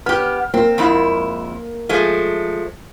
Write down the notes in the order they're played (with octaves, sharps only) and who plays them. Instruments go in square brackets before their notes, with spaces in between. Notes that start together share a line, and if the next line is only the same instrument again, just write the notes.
[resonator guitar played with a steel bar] B3 G4 [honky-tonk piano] F6
[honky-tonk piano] A#3 [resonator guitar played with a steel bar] C4
[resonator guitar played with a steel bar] F2 G#2 E4
F3 G#3 A3